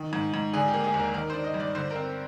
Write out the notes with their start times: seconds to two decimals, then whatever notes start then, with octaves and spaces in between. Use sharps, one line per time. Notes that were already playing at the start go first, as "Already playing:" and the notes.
Already playing: D#3
0.13 G#2
0.34 G#2
0.53 D3 G#4
0.68 G4
0.74 A#3
0.84 G#4
0.94 D#2
0.99 A#4
1.14 D#3 A#4
1.30 D4 C5
1.44 D#5
1.54 G2
1.60 D5
1.75 D3 C5
1.91 A#4
1.96 C4